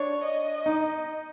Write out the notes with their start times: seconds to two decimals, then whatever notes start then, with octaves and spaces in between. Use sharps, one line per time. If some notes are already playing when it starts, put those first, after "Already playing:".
Already playing: D4 C#5
0.24 D#5
0.66 D#4